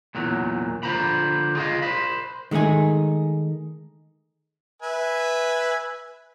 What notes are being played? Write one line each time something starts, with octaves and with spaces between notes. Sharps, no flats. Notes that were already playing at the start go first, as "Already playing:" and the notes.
E2 A#2 F#3
D3 F3 C5 A#5 B5
F4 G#4 A#4 D5 D#5 F5
C5 B5
D#3 G#3 A3 D#4 G#4
B4 E5 G#5